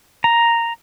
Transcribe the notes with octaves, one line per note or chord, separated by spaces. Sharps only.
A#5